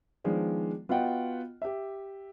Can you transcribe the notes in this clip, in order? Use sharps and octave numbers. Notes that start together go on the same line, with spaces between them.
D#3 F3 G#3 B3 D4
B3 F4 F#4 D#5 F#5 G5
G4 E5